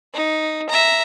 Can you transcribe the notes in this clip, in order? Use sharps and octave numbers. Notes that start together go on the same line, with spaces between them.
D#4
E5 A#5